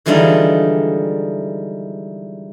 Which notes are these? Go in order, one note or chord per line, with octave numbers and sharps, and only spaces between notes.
D3 E3 F3 G3 G#3 D#4